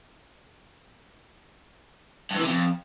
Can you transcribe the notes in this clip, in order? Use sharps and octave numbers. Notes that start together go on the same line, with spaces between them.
G2
E3
C3
F2